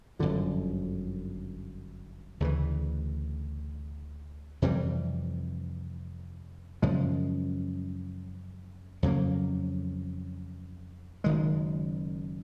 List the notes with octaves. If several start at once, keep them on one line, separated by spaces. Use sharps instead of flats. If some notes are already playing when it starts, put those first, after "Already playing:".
G1 F#2 D3 F3
D2 C#3 E3
F2 C3 E3 G3
F#2 C#3 F3 G#3
F2 C#3 F#3 A#3
F#1 F#2 D#3 G#3